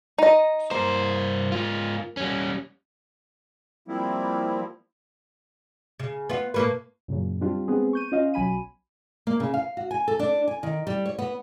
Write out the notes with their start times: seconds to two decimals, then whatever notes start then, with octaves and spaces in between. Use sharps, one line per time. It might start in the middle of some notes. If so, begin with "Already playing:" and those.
0.18 D#4 D#5
0.71 G2 A#3 C5
1.52 G#2 F4
2.17 G3 C#4
3.88 F3 G3 A#3 C4 E4
6.00 C#3
6.29 B3 F4
6.54 A2 A#3 B4
7.08 F#2 A#2 C#3 F#3
7.41 G3 C4 D4 F4 G4
7.68 G#3 B3 C4 G#4
7.93 C#6 G6 D#7
8.12 C#4 F4 D#5 F5
8.34 B1 F#3 G#5 B5 D#7
9.27 A#3
9.40 C#3
9.54 F5
9.77 F#4
9.91 G#5
10.08 A4
10.19 D4
10.48 G#5
10.63 D#3
10.87 G3
11.06 C#5
11.19 B3